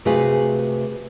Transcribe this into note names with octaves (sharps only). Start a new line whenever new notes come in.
C3 A3 F#4 G#4 B4 F5